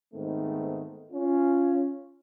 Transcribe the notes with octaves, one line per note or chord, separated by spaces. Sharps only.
G#2 D#3 A3 B3 C4
C#4 F4